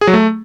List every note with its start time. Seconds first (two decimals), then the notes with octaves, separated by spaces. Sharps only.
0.01 G#4
0.07 F#3
0.13 A3